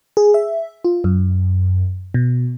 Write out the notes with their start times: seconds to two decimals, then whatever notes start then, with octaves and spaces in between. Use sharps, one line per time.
0.17 G#4
0.34 E5
0.85 F4
1.04 F#2
2.14 B2